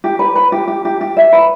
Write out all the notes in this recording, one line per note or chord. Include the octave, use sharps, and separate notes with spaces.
G4
B4
B4
G4
G4
G4
G4
E5
B4